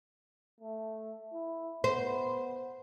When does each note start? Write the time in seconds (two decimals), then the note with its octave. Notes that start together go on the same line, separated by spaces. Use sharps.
0.60 A3
1.33 E4
1.84 B3 C5